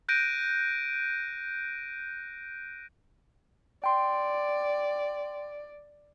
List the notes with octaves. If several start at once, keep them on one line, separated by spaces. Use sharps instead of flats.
F#6 G6 A#6 D7 D#7
D5 G5 C6